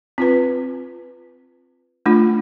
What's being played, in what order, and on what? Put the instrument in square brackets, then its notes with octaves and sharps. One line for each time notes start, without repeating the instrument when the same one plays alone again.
[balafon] C4 F4 B4
A3 D4 F4